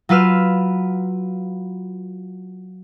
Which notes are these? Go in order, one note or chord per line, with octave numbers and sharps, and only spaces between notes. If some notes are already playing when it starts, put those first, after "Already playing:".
F#3 F4 B4 E6 F6